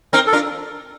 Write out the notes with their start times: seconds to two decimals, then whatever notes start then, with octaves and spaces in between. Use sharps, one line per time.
0.13 C4 D#4 A#4
0.27 A4
0.32 D4 F4 A#4